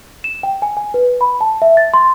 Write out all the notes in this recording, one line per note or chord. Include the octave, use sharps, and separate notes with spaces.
E7
G5
G#5
G#5
B4
B5
A5
E5
A6
C6